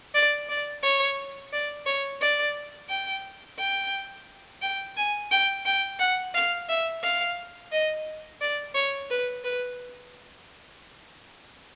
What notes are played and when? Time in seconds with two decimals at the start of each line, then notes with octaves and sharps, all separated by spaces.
0.14 D5
0.49 D5
0.82 C#5
1.52 D5
1.86 C#5
2.21 D5
2.89 G5
3.59 G5
4.62 G5
4.97 G#5
5.31 G5
5.65 G5
5.99 F#5
6.34 F5
6.69 E5
7.03 F5
7.72 D#5
8.41 D5
8.75 C#5
9.10 B4
9.44 B4